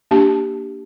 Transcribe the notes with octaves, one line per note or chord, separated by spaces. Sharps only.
A#3 D4 G4 A5